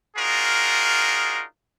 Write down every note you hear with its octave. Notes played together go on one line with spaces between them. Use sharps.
D4 D#4 F4 F#4 G#4 A#4